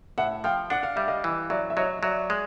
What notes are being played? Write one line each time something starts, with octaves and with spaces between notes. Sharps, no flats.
A2 E5 F#5
F3 F5 G5
D4 F#5
F5
G3 E5
D#5 F5
E3
F#3 D5 E5
E5
F#3 C#5 D#5
F#3 D5 E5
G#3